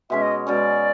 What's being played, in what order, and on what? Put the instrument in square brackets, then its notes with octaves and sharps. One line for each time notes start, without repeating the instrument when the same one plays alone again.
[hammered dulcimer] B2 G#3 C#4 [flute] E5
[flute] D#5
[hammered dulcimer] B2 G#3 C#4 [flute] D5